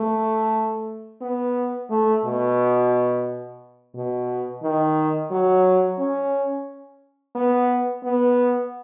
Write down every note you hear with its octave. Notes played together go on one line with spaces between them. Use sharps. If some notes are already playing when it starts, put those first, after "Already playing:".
Already playing: A3
B3
A3
B2
B2
D#3
F#3
C#4
B3
B3